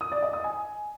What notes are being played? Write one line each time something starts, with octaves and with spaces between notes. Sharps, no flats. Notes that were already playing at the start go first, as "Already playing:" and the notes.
D#6
D5
D#5
D#6
G#5